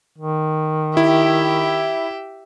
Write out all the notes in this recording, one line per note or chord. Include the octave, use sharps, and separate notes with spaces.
D#3
E4 G4 E5